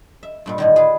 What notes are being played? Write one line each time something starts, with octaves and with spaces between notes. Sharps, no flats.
E5
G2 A#2 G3
A2 D3 D#3
F4 G#4 B4